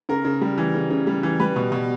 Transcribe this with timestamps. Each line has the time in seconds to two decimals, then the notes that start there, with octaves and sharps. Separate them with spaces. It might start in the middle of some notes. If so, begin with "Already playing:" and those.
0.09 C#3 A#4
0.25 C#3
0.41 G3
0.58 E3
0.74 C#3
0.90 C#3
1.07 G3
1.23 E3
1.40 G3 B4
1.56 B2
1.72 B2